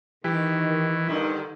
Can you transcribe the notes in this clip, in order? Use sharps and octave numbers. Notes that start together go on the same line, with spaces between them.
D#3 E3 G4
G2 D3 D#3